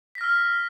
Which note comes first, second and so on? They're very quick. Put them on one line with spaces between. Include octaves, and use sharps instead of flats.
B6 A#6 F6 E6